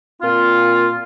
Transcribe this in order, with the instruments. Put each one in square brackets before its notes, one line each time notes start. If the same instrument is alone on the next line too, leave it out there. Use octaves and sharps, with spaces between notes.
[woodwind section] A#2 C4 F4